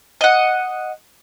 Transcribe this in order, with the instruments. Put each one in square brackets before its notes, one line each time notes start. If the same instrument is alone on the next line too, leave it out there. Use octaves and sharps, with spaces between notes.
[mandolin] D#5 F#5